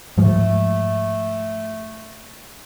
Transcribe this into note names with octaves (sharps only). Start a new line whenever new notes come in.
G#2 F3 G#3 A3